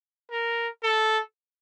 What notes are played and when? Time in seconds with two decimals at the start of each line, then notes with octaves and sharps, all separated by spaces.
0.31 A#4
0.83 A4